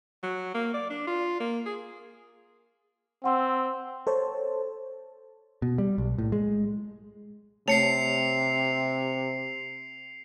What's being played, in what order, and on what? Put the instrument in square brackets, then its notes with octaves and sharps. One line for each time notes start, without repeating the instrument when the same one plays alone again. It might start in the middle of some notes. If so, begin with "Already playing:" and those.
[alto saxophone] F#3
A#3
D5
D4
F4
A#3
G#4
[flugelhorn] C4 [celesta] F#5 C6 E6
[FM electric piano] A4 C5 C#5 A5
[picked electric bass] B2
G3
B1
A2
G#3
[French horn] C3 [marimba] A3 C#5 A5 [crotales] C7 C#7 F7